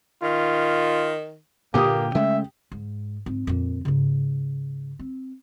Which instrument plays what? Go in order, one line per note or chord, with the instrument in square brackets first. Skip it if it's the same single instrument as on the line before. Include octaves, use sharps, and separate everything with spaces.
[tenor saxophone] D#3 [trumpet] F4
[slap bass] G2 A#2 D3 [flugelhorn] A#3 [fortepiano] G4 D#6
[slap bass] C#3 G#3 A3 [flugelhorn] E5
[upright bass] G#2
G#2 C4
F2 A#2
G#2 C#3
C4